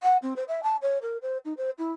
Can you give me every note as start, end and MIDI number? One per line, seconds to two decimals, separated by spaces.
0.03 0.17 78
0.22 0.34 60
0.36 0.44 72
0.48 0.60 76
0.63 0.77 81
0.82 0.98 73
1.02 1.18 70
1.22 1.38 72
1.45 1.53 63
1.57 1.70 72
1.78 1.92 64